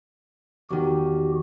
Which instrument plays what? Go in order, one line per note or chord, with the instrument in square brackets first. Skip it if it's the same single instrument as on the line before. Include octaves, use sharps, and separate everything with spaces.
[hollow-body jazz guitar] E2 D#3 [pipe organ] F#4 G4